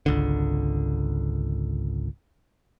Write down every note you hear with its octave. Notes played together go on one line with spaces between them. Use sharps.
G#1 C#2 D3